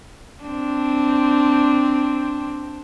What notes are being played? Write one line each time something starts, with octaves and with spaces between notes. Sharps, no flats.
C4 D4